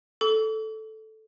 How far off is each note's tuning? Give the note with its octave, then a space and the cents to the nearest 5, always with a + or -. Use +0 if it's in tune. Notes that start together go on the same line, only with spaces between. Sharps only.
A4 -5 D6 -45